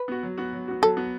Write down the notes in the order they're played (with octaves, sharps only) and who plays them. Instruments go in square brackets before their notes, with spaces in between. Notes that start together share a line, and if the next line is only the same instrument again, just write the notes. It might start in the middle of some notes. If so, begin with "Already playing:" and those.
Already playing: [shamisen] B4
[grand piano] B3 F#4
F#3
B3 F#4
F#3
B3 F#4
[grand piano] F#3 [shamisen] A4
[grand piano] B3 F#4